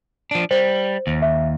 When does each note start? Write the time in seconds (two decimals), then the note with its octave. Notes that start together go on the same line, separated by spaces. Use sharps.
0.31 F3 D4
0.51 G3 C5
1.07 D#2
1.22 E5